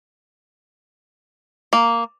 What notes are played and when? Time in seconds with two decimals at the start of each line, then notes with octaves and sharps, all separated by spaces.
1.73 A#3